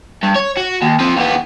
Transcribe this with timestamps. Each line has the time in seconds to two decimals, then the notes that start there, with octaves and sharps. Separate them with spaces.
0.23 G2
0.35 C#5
0.57 F#4
0.82 D#2
1.00 F3 C4
1.16 D#2 B3